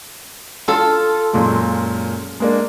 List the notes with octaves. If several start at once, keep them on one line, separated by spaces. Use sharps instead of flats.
F4 A4
F#2 A#2 G#3
G#3 A#3 D4